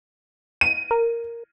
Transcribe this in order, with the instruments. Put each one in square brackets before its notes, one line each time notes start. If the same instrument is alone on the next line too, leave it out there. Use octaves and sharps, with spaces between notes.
[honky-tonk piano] D#7
[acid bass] A#4